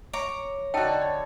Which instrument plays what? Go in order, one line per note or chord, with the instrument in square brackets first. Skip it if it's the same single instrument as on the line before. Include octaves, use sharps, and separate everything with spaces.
[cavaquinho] C#5 A#5 D6
[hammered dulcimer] D3 D4 A4 [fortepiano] D#4 F#4 [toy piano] G5 A5
[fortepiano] C#5